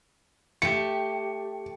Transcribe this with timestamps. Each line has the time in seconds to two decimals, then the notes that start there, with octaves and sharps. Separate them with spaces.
0.62 A3 G4 C#7